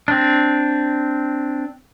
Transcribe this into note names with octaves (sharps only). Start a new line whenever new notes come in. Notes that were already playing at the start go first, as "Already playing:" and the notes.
C4 D4